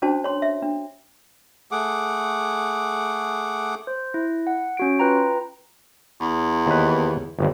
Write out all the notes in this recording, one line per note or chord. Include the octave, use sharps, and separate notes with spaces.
C#4 D4 F#4 C5 A5
C#5 C6
E5
D4
A3 G#4 F#5 D6
C5
E4
F#5
C#4 F#4 D7
F4 B4 G5 A#5
E2
D#2 B4
G1 D#2